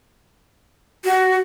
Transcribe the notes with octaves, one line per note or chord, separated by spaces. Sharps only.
F#4